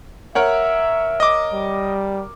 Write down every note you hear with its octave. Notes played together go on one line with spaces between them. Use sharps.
A#4 C#5 E5 F#5
D#5 D6
G3